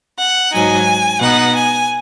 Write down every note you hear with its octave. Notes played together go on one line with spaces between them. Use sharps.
F#5
G#2 F#3 D#4 G#5
B2 B3 D#4 F#5
G#5